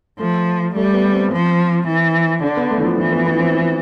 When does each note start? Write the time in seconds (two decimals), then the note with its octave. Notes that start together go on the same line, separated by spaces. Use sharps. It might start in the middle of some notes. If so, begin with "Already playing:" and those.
0.19 F3 A3
0.75 G3 A3
0.94 B3
1.13 C4
1.31 F3
1.87 E3
2.43 D3 D4
2.57 B3
2.70 A3
2.78 E3
2.84 F3
2.98 E3 F3
3.12 B3
3.26 B3
3.40 C4